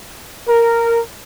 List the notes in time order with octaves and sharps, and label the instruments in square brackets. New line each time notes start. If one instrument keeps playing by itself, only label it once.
[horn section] A#4